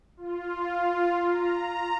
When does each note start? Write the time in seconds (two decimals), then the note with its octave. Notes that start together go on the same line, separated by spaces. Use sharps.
0.17 F4
1.25 A#5